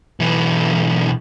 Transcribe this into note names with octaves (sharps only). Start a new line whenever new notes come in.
B1 E3